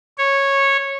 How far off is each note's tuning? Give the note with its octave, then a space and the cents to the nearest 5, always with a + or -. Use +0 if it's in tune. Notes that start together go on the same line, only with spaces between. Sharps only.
C#5 -10